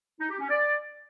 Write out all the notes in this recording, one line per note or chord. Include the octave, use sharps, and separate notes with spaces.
D#4
G4
C#4
D5